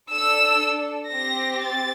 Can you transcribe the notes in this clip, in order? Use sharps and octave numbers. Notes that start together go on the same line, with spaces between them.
D4 A4 E6
C4 G4 A#6
A6